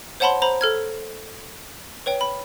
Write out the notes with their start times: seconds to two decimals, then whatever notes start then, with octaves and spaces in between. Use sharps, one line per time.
0.20 C5 C#5 F#5 A5 B5 C6
0.42 C5 A#5 B5
0.61 A4 F6 G#6
2.06 B4 C#5 G5
2.21 B5